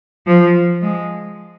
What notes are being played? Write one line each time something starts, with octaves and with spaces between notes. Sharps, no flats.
F3
G#3